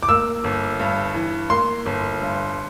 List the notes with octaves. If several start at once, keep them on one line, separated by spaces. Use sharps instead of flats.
D6
A#3 E6
G1
G2
E3
A#3 C6
G1
G2